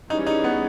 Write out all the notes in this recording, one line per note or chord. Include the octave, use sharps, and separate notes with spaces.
E3 G3 C#4 D#4 G#4 C#5
D#4
B3